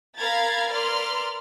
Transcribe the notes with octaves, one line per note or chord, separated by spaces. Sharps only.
A#4 F5 A#5 B5 G#6 A6
A#4 B4 D5 C6 F6